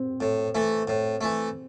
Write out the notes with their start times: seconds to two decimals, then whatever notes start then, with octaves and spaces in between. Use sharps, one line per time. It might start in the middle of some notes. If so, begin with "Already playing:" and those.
Already playing: C4
0.21 A2
0.55 E3 A3
0.88 A2
1.21 E3 A3